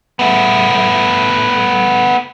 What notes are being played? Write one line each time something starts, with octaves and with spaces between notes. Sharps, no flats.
A3 B3